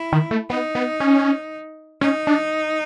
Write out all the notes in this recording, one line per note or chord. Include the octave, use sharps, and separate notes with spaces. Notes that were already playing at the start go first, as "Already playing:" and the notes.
Already playing: E4
D#3
A3
B3 D#4
B3
C#4
C#4 D#4
D4